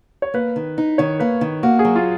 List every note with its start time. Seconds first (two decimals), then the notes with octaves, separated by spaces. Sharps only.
0.22 C#5
0.34 A#3 B4
0.56 D#3
0.78 D#4
0.98 D#3 C#5
1.20 A#3 B4
1.41 D#3
1.63 A#3 F#4
1.79 G#4
1.85 F#3
1.96 F4